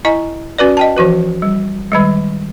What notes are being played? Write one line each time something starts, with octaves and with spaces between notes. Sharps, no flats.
E4 D#5 G#5 A#5
C#4 F#4 B4 D5
D#5 G5 A5
E3 F3 F#4 B4
G3
D#3 G3 G#3